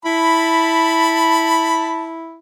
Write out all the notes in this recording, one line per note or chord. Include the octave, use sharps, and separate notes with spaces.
E4 A5 B5